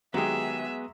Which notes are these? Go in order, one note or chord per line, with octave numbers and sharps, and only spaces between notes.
D#3 F#3 G#3 B3 G4 G#4 E5